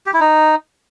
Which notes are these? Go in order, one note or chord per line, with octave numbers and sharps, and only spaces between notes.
G4
E4
D#4